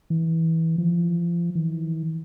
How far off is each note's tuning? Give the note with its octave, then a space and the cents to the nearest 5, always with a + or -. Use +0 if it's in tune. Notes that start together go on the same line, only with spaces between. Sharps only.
E3 -20
F3 -30
E3 -40